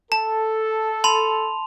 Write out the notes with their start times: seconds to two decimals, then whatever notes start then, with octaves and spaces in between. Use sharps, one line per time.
0.12 A4 A5
1.04 A5 B5 C6 F7